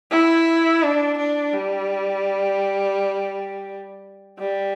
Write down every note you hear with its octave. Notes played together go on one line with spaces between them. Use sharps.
E4
D4
D4
G3
G3